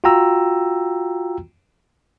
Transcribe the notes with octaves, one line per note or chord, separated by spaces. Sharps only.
F4 F#4 G5 A#5 E6